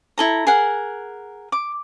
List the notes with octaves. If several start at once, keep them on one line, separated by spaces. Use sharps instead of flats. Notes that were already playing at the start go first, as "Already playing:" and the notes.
E4 A4 A#5
G#4 A#4 F#5
D6